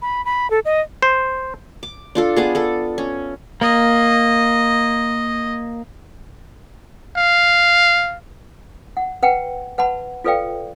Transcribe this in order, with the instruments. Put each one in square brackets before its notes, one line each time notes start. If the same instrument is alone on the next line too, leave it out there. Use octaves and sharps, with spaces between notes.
[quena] B5
B5
A4
D#5
[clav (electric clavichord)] C5
[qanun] D6
D4 F4 A4
B3 D4 G#4
D4 A4
C#4
[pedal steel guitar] A#3 [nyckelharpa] D#5
[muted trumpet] F5
[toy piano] F#5
B4 F#5 G5 A#5
B4 F#5 A5 B5
F4 A4 B4 D5 F5 G5